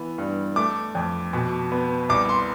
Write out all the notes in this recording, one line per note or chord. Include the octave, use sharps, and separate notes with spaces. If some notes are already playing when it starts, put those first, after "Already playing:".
Already playing: E3 B3
G2
A3 D6
F2
B2
B3
C2 D6
C6